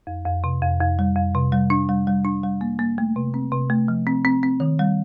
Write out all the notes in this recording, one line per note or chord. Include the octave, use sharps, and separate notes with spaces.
F2
F2
C3
F2
F2
G3
F2
C3
G3
D4
G3
G3
D4
G3
A#3
A#3
A3
C3
C4
C3
A3
F3
C4
C4
C4
D#3
G3